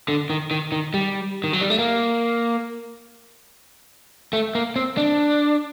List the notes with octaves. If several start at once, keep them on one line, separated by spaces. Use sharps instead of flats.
D3
D#3
D#3
D#3
G3
D#3
F#3
G3
A3
A#3
A3
A#3
C4
D4